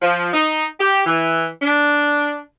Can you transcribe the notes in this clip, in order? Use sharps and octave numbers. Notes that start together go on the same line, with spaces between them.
F3
D#4
G4
E3
D4